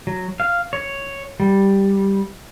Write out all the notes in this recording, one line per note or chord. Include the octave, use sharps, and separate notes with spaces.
F#3
F5
C#5
G3